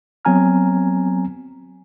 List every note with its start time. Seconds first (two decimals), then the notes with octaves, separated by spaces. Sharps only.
0.25 F#3 B3 C4 G#5 A#5 F6